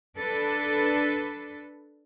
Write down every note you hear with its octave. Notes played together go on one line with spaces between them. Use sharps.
D4 A4 B4